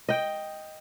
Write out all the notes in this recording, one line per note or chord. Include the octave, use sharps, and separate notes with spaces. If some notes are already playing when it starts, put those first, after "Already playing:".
D#5 G5